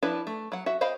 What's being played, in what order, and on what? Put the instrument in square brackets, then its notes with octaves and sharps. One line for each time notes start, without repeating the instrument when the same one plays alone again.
[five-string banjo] F3 D4 E4 B4
A3
F#3 F#5
F#4 E5
C5 D#5 F5 G5 B5